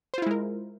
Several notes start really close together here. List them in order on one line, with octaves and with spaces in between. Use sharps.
C5 F4 E4 G#3 A#4